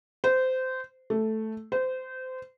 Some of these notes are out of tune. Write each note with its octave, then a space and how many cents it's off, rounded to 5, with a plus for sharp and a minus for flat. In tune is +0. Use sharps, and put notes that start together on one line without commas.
C5 -20
A3 -5
C5 -25